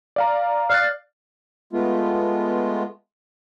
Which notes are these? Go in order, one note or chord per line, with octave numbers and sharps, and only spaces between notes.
D5 F5 A#5
D5 F5 F#6 A6
G#3 A3 B3 F4